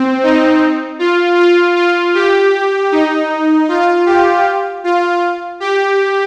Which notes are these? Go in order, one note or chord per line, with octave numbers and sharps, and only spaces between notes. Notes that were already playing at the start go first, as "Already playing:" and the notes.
Already playing: C4
D#4
F4
F4
F4
G4
D#4
F4
G4
F4
G4